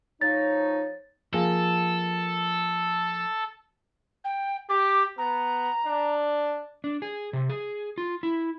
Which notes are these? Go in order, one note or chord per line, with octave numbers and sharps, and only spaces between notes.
F3 D#4 C#5 A6
F3 A#3 G#4 A4
G5
G4 D6
B3 A#5
D4
D4
G#4
C3
G#4
F4
E4